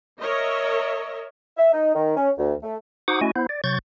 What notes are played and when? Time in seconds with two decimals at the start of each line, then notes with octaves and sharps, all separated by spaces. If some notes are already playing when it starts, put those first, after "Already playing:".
0.19 A#4 C#5 D#5 E5
1.58 E5
1.73 D#4
1.95 D#3
2.17 C#4
2.38 D2
2.62 A3
3.08 D#4 F#4 C5 F#5 D6 D#6
3.21 A3 C#4 E4 F#4 D#5 G#5
3.36 B3 E4 C5
3.49 D5
3.64 C3 F#3 C#6 G6 A6